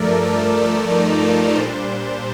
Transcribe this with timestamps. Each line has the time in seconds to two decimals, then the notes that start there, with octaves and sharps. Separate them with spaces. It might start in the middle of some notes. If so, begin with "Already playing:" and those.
Already playing: G2 F3 A3 A4 A#4 D5
0.25 A4
0.57 D5
0.90 D#4
1.22 F4
1.55 A#2 G3 D4 C5